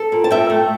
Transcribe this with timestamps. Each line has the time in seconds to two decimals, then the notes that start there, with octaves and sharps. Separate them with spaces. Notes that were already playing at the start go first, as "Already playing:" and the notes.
Already playing: A4
0.12 A#2
0.24 A5
0.31 A#2 E5 G5
0.50 A3